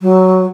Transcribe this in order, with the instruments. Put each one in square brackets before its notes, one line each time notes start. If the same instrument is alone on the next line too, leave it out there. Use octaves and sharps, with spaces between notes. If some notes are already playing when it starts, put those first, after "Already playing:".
[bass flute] F#3